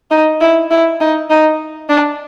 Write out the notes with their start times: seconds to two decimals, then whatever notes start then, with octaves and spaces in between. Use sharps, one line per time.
0.11 D#4
0.41 E4
0.71 E4
1.00 D#4
1.30 D#4
1.89 D4